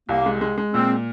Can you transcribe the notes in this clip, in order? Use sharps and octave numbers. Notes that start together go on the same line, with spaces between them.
C2 A#3
G#3
G#3
G#3
A#2 C4